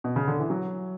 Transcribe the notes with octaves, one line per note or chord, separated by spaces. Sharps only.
B2
C#3
D3
E3
F#3